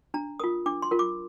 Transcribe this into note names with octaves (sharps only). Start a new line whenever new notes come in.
D4 A#5
F4 A#4 D#6
D4 D6
C6
F4 A#4
D6